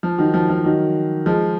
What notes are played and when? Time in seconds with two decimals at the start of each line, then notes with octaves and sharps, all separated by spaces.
0.03 F3
0.18 D#3 F#3
0.34 F3
0.50 F3
0.65 D#3 F#3
1.26 F3 G#3